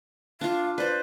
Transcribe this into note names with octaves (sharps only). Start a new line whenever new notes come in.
D4 F4 F5
B4 C5 D5